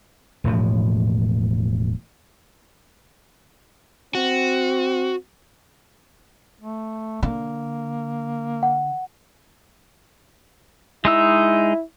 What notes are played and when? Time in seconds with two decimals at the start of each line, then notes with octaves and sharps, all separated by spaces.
0.44 E1 A2 F3
4.15 C4 F#4
6.61 A3
7.23 D3 A#3
8.63 F#5
11.05 G#3 D#4 E4 E6